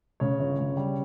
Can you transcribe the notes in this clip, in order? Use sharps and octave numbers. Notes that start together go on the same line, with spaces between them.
C#3 C#5
G1
C#3
G3